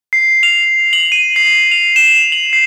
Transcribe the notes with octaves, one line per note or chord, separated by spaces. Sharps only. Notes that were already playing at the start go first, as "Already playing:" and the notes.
C7
F7
F#7
D#7
C7
F7
E7
F#7
C7